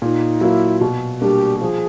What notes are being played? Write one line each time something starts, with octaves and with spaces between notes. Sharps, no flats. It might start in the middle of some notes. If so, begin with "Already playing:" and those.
A#2 D#4
F#3 A#3 E4
B2
G3 A#3 D4 G4
F3 G#4